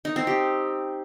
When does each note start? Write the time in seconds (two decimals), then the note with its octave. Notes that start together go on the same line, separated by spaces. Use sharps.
0.05 D#4
0.16 C4
0.27 G4